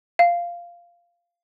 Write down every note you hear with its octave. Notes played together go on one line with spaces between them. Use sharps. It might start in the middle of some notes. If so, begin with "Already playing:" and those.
F5